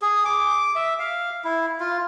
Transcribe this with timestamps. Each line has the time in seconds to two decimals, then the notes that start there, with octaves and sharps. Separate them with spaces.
0.02 G#4
0.25 D6
0.75 E5
0.99 F5
1.44 E4
1.80 F4